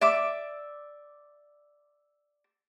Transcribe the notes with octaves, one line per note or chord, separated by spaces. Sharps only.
D5 E5 D6